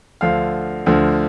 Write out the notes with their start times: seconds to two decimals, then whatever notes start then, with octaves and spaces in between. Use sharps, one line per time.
0.21 D2 D3 F3 F5
0.86 D2 D3 F3